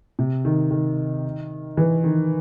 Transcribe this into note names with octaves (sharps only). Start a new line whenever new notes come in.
C3
D#3
D#3
E3
D#3